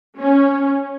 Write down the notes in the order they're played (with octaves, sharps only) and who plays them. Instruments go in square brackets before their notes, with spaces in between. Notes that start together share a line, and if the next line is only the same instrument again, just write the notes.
[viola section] C#4